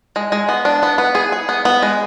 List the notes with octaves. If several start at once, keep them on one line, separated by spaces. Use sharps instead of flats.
G#3
G#3
B3
D4
B3
B3
G#4
G#4
B3
B3
G#3